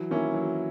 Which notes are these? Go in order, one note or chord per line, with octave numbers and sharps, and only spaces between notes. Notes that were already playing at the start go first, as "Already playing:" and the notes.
Already playing: E3 F#3
D#3 A#3 C#4 E4
E3 F#3